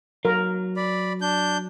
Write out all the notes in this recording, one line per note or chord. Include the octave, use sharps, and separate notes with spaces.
F#3 A#4
D5 B5
D4 G6